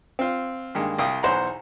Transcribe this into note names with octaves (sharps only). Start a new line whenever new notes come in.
C4 F4
G2 D#3 G#3 A#3
C2 F5 G5 D#6
B1 E2 E3 C5 F#5 A#5